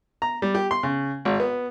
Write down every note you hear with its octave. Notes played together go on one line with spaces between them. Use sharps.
A#5
G3
G4
C6
C#3
G#1
B3